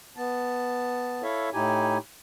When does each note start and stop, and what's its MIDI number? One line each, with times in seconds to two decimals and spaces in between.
0.17 1.22 59
0.17 1.22 81
1.23 1.49 64
1.23 1.49 69
1.23 1.49 73
1.23 1.49 76
1.23 1.49 77
1.53 1.98 45
1.53 1.98 63
1.53 1.98 64
1.53 1.98 67
1.53 1.98 80